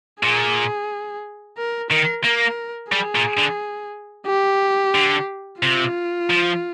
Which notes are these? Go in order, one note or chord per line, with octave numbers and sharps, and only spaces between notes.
A#2 G#4
A#4
D#3 A#4
A#3 A#4
G3 G#4
A#2
D3
G4
D3
C3 F4
F3